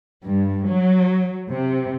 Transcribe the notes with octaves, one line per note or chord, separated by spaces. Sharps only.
G2
F#3
C3